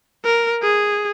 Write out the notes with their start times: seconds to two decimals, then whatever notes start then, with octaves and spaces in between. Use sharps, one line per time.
0.24 A#4
0.63 G#4